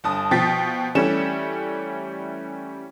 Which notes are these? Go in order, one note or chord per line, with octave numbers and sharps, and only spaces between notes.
G1 A5 D#6
B2 F3 G5 A6 B6
E3 G3 A3 C#4 E7